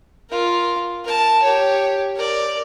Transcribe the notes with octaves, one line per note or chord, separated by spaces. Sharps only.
F4 A#4
A#4 A5
G4 C#5
A#4 D5